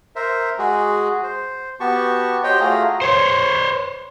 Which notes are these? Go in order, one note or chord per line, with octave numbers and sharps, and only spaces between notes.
A#4 C5 E5
G#3 F#4 G#4
C5
B3 F#4 G4 A5 C#6
F#4 G4 C5 C#5 D#5 G5
A3 F4 F#4 G#4 A#5
C5 C#5